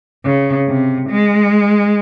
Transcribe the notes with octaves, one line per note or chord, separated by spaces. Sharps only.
C#3
C3
G#3